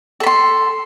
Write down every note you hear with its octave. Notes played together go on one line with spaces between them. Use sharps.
A4 B5 C6